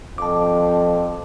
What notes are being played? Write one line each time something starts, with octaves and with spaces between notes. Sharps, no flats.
F2 A5 D6